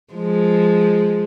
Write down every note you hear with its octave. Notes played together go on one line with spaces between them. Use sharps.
F3 G#3